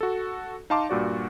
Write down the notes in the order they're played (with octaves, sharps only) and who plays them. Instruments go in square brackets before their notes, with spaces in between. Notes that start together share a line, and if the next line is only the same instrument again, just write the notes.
[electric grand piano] F#4 A4
D#4 F5 A5 C6 D6
G2 A#2 F#4 D5